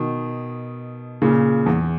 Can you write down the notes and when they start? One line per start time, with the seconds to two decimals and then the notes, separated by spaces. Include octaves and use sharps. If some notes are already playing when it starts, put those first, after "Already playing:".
Already playing: B2 D#3
1.22 A#2 C#3
1.66 E2